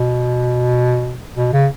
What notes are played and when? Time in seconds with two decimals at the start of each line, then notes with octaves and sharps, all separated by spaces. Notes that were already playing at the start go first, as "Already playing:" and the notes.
Already playing: B2
1.36 B2
1.52 C#3